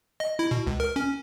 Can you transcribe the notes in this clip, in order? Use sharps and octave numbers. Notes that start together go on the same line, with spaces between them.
D#5
E4
B2
C#2
A#4
C#4